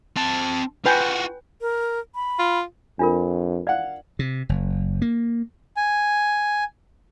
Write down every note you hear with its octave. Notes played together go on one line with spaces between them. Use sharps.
C4 A5
F4 F#4 B4 G5 G#5
A#4
B5
F4
F2 D4 F4 A#4
D5 F5 F#5
C3
F#1
A#3
G#5